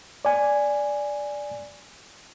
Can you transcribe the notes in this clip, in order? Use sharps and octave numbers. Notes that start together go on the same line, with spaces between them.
D5 G#5